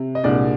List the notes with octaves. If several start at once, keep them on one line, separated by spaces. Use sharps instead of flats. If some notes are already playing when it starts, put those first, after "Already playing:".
Already playing: C3
D#5
C2 A#2 G#3 D4 D5